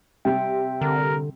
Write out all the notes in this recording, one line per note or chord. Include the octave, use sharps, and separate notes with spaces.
C3 G3 C4 E5 G5
D3 A#4